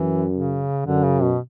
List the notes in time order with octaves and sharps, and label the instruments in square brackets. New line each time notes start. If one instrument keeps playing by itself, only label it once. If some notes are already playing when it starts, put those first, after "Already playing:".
Already playing: [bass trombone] F#2 [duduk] E3
[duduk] C#3
[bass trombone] F#2 [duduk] D3
[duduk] C#3
B2